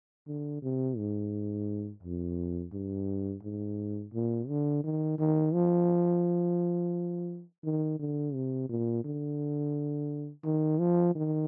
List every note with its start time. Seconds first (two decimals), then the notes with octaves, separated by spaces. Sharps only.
0.27 D3
0.63 C3
0.97 G#2
2.03 F2
2.73 G2
3.43 G#2
4.14 A#2
4.49 D3
4.84 D#3
5.19 D#3
5.54 F3
7.64 D#3
7.99 D3
8.34 C3
8.69 A#2
9.05 D3
10.45 D#3
10.80 F3
11.15 D#3